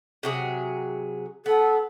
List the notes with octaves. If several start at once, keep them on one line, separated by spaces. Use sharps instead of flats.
C3 F#3 G#4
B3 A4